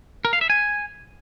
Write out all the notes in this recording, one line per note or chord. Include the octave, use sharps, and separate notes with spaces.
A#4
F5
E5
G#5